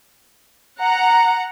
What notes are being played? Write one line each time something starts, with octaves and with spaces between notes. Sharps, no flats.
F#5 A#5